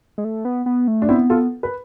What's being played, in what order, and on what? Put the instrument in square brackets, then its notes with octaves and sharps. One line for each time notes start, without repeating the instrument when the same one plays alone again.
[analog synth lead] G#3
A3
B3
B3
A3
[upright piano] D4
[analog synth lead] B3 [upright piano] C4 E4
[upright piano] F4 A4
B4